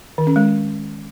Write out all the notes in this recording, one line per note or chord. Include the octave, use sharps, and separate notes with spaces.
D#3
C#4
G#3